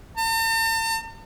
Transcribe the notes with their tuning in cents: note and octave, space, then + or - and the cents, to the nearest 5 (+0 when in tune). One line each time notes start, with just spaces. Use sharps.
A5 +45